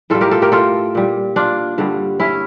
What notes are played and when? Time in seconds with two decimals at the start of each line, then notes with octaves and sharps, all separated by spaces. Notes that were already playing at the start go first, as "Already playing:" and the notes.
0.10 A2 G3 F4 A4
0.21 G4 A#4
0.31 F4 A4
0.42 G4 A#4
0.52 F4 A4
0.95 A#2 G3
1.36 D4 F4
1.78 G2 D3 G3
2.20 C#4 E4